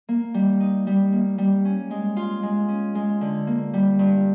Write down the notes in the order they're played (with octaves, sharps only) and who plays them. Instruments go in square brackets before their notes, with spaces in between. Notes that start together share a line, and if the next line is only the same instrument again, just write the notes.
[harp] A#3
G3
D#4
G3
A#3
G3
C#4
G#3
F4
G#3
C#4
G#3
D3
A#3
G3
G2